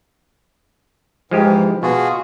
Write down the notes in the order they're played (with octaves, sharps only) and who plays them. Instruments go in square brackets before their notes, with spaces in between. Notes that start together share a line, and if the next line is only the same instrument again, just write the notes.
[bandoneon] G#2 E3 [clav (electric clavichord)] F3 G#3 G4
[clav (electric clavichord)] B2 [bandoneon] F4 F#4 G#4